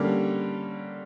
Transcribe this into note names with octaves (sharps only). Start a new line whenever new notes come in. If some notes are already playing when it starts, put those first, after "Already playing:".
Already playing: D3 G3 A#3 C#4